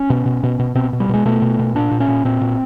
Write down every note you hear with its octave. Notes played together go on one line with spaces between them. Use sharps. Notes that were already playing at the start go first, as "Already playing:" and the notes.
Already playing: C#4
B2
B2
B2
B2
B2 C4
B2
G3
B2 G#3
B2 A3
B2
B2
A#2 D4
A#2
C#4
A#2
A#2 C4
A#2